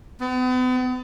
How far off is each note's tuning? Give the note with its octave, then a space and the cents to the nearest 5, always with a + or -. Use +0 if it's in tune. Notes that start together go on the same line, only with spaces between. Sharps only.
B3 +40